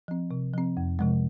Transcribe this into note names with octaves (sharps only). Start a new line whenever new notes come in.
F3 C4
C3
F3 C4
F2
C3 F3 G#3